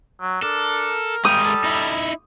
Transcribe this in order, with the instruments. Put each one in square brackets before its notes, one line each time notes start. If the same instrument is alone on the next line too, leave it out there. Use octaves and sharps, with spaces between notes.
[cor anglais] F#3
[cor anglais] D4 [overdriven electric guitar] A4 [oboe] A#4
[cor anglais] G3 [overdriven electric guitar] G#3 A#4 [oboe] G5 [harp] D#6
[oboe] A4
[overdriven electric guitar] D#4 E4